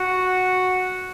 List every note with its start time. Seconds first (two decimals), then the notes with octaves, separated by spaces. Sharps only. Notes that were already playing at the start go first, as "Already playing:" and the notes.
Already playing: F#4